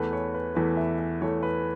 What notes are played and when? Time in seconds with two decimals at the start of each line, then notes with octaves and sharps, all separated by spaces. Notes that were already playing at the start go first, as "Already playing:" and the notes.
Already playing: E2 E3 A3 B4
0.13 C#5
0.34 B4
0.55 E2 E3 A3 B4
0.77 E5
0.99 E5
1.22 E2 E3 A3 C#5
1.43 B4